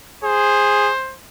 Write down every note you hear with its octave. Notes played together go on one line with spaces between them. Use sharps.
G#4 C5